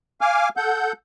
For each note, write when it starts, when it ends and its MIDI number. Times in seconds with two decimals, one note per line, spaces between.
0.21 0.49 77
0.21 0.49 80
0.21 0.49 86
0.21 0.49 89
0.57 0.92 69
0.57 0.92 78
0.57 0.92 91